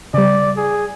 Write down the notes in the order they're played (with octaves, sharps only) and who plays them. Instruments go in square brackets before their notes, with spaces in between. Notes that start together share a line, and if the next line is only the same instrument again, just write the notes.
[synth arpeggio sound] C#3 G3 [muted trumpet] D5
[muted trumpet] G#4